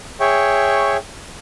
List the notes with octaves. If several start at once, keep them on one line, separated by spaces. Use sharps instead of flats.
G#4 C#5 E5 G5 C#6